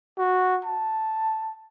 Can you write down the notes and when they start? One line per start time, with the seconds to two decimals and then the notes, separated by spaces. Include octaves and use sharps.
0.18 F#4
0.65 A5